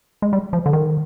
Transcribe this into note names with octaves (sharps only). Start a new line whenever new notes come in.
G#3
G3
F3
D3
D#3